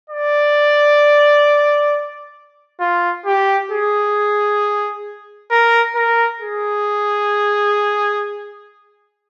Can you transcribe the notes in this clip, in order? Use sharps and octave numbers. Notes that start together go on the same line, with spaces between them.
D5
F4
G4
G#4
A#4
A#4
G#4